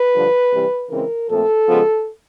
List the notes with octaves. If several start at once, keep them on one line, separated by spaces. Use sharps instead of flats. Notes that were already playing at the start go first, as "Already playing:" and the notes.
Already playing: B4
G2 D3 F3
C3 E3 G3
C#3 E3 G#3 C4 A#4
A#2 F3 A3 C4 A4
C#3 F3 G#3 B3